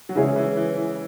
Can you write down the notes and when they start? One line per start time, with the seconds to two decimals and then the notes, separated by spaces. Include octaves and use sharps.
0.09 F#3
0.15 C#3 E3 G#3 E4 G#4 C#5
0.36 E3
0.57 E3
0.77 E3